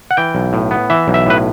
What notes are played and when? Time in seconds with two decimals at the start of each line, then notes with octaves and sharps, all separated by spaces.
0.11 F#5
0.17 E3 G5
0.35 B1
0.53 A2
0.71 B3
0.90 E3 E5
1.08 B1
1.14 E5
1.26 A2 B4